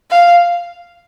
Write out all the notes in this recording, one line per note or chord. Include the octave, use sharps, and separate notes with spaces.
F5